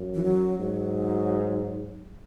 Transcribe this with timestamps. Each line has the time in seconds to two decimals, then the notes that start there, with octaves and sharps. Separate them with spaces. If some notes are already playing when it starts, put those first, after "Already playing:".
Already playing: F#2
0.14 E3
0.23 F#3
0.59 G#2 F#3